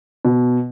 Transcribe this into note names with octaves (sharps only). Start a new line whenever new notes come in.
B2